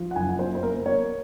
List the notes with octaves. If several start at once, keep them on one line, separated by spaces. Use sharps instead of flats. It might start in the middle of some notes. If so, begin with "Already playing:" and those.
Already playing: F3
F#5
F#1 G#5
A#3 C5
C5
A#3 A#4
A#3 C#5